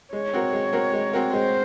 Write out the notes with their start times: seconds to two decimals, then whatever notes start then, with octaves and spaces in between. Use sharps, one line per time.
0.13 G#3 C#5
0.33 C4 F#4 A#4
0.53 G#3
0.73 C4 F#4 A#4
0.93 G#3
1.13 C4 F#4 A#4
1.33 G#3 C5